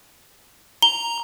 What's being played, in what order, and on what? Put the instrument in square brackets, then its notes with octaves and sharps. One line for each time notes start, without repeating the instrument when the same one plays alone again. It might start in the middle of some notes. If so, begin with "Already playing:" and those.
[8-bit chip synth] A#5 [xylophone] G7